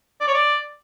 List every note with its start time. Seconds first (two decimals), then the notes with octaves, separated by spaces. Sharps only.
0.21 D5
0.27 C#5
0.34 D5